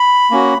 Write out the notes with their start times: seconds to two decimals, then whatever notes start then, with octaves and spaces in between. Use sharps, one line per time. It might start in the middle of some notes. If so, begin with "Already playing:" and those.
Already playing: B5
0.31 A#3 C#4 F#4